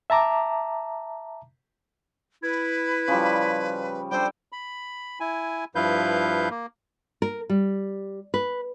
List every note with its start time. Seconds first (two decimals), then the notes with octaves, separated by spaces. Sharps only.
0.10 E5 A5 A#5 D6
2.43 E4 B4
3.08 C#3 F3 G3
4.11 G3 D4 A4 C5 G5
4.52 B5
5.20 E4 G#5
5.75 G2 F3 E4 B4 F5 G6
6.51 A#3
7.22 A#4
7.50 G3
8.34 B4